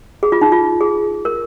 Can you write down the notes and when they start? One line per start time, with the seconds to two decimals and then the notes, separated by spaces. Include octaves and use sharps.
0.23 G#4
0.32 F4
0.41 D#4
0.52 F4
0.81 G#4
1.25 A#4